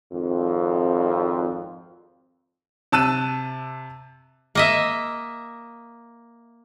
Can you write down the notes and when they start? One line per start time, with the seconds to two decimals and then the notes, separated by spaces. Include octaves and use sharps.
0.12 G#1 F2
2.92 C3 A5 E6 F#6 D#7
4.55 A#3 D#5 E5